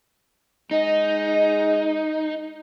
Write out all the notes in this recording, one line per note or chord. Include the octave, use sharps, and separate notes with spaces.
G#3 D#4 D#5